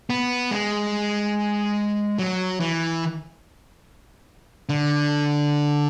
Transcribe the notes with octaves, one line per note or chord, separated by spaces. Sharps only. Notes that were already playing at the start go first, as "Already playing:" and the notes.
B3
G#3
F#3
E3
D3